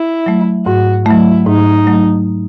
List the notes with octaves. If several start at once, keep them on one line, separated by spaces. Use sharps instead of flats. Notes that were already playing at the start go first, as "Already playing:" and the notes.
Already playing: E4
F#3 A3
G#2 F#4
F#3 A3 E4
G#2 D#4
F#3 A3